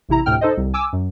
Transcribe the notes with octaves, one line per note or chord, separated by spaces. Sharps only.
A1 C3 E4 A#5
D2 A2 C3 G5 F6
D#4 A4 C5 D#5
C2
G#5 D6 E6
F#2